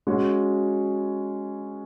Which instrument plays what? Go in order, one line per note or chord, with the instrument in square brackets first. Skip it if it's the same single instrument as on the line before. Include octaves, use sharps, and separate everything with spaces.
[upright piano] G#3 C#4 F#4